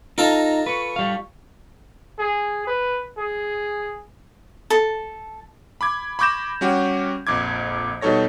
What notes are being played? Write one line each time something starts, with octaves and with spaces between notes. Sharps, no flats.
D#4 F4 A4 A5 A#5
B4 C#6
G3 F5
G#4
B4
G#4
A4 A5
B5 D6 G#6
B5 C#6 D6 G6 A#6 E7
G3 C#4 F#4 G4
A#1 F2 D6 G#6
B2 G3 D#4 A4 C#5 A#6